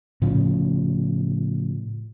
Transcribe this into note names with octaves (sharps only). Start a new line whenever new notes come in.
A2 C#3 F3